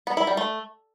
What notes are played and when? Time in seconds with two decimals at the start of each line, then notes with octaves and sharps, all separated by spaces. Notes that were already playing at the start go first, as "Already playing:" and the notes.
0.07 B3
0.17 E4
0.27 G3
0.37 A3